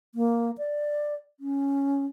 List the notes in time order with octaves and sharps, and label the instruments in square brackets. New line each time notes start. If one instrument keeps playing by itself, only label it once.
[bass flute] A#3
D5
C#4